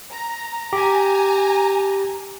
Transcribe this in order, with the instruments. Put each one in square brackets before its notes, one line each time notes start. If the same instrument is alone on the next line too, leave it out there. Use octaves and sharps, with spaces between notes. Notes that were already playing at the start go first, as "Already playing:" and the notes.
[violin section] A#5
[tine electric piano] G4 [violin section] G#5 A#5